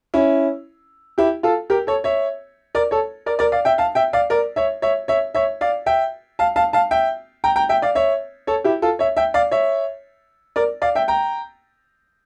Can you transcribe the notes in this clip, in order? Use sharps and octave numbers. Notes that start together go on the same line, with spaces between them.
C#4 E4
E4 G4
F4 A4
G4 A#4
A4 C#5
C#5 E5
A#4 D5
A4 C#5
A#4 D5
A#4 D5
D5 F5
E5 G5
F5 A5
E5 G5
D5 F5
A#4 D5
C#5 E5
C#5 E5
C#5 E5
C#5 E5
D5 F5
E5 G5
F5 A5
F5 A5
F5 A5
E5 G5
G5 A#5
G5 A#5
E5 G5
D5 F5
C#5 E5
A4 C#5
E4 G4
F4 A4
C#5 E5
E5 G5
D5 F5
C#5 E5
A#4 D5
D5 F5
E5 G5
G5 A#5